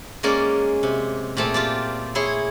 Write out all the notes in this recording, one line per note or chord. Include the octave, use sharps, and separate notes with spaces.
G#3 A#3 C#4 D5
C3
A#2 A3 C4 G#4 A5
F4 G4 D5
E4 G#4 C#5 C6